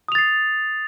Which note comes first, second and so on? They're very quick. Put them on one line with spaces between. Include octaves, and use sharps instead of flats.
D#6 F7 A6 C7